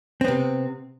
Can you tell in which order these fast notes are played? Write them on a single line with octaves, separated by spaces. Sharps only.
C4 B3 C3